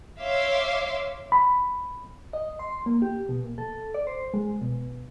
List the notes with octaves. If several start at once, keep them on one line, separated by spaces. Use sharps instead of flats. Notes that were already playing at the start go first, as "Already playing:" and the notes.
C#5 E5 F5 C6 D6
B5
D#5
C6
A#3
G4
B2
A#2
A4
D5
C5
G#3
B2